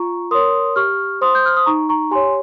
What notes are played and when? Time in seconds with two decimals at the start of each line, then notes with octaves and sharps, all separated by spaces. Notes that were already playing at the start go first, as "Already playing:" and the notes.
Already playing: F4 A#5 C#6
0.31 A#4 C#5 C6 D#6
0.76 G4 C#6 F6
1.21 C5 C6 D#6
1.35 G6
1.45 F6
1.57 D#6
1.66 D#4 A#5 C#6
1.89 A#5 C#6
2.11 G4 C#5 G#5 C6